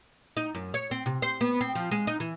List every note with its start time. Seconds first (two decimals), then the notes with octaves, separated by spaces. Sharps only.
0.37 D#4
0.55 F#2
0.74 C#5
0.91 C4
1.06 C3
1.22 C5
1.41 B3
1.61 C4
1.75 F3
1.91 G#3
2.07 D#4
2.20 E3